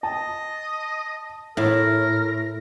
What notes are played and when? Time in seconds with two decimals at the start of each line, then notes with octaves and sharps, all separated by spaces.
0.03 D#5 A5
1.57 A2 E4 A#4